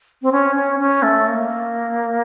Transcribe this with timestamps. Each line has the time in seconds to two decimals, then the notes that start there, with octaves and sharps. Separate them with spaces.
0.22 C4
0.32 C#4
0.56 C#4
0.80 C#4
1.03 A3
1.27 A#3